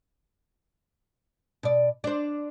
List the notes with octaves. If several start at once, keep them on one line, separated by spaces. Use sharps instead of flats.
B2 D5
D4 C5